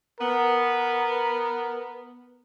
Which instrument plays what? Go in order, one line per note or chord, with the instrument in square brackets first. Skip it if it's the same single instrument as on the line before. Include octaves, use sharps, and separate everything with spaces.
[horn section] B3 [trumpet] A#4